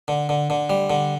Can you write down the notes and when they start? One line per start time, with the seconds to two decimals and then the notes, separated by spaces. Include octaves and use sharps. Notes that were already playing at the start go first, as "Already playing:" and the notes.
0.08 D3
0.29 D3
0.50 D3
0.70 G3
0.90 D3